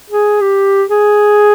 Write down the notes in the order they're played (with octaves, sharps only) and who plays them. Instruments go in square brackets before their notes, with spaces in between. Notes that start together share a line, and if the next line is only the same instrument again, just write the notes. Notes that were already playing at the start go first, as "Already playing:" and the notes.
[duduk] G#4
G4
G#4